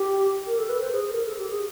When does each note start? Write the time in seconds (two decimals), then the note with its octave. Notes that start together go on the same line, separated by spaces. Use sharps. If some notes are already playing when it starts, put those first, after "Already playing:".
Already playing: G4
0.47 A#4
0.58 A4
0.69 B4
0.81 C5
0.93 G#4
1.10 A#4
1.27 A4
1.38 G4
1.50 G#4